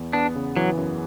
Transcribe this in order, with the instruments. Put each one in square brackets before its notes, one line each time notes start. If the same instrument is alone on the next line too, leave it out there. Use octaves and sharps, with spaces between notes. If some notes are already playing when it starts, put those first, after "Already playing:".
Already playing: [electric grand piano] E2
[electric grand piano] B3 [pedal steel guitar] D4
[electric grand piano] C#3
[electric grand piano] E3 [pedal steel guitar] F#3
[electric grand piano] F#2